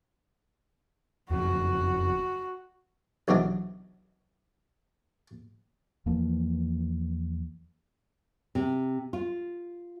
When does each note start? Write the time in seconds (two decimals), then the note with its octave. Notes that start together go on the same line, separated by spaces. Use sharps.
1.31 F#1 F2 C#3 F#4
3.28 B1 C3 E3 F#3 D4 D#5
6.06 E2 E3 F3 A#3
8.55 C3
9.13 F4